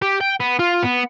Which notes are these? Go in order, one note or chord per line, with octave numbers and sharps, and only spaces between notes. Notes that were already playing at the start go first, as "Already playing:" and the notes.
G4
G5
B3
F4
B3